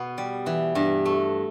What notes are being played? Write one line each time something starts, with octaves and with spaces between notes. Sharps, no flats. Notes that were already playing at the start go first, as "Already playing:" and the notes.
Already playing: B2 B3
G3
E3
G2
A3